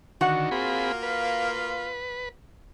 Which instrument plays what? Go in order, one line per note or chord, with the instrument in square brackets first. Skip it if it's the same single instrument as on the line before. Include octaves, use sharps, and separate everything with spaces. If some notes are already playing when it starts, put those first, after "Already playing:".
[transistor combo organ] D3 D#3 [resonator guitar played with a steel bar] F#4 F#5
[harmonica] A#3 F4 [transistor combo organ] C4 G#4 B5
[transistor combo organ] B4